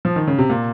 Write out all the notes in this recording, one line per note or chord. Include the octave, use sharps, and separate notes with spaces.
F3
D#3
C#3
C3
A#2